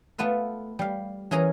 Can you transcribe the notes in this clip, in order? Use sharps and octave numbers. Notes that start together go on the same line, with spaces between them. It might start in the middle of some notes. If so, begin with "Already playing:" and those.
A3 B3 F4 B4 E5
G3 F5
E3 C#4 G#4 A#4 A#5